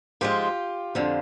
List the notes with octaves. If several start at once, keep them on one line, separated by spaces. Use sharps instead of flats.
G#2 F3 G#3 F4 G4
F2 D3 F3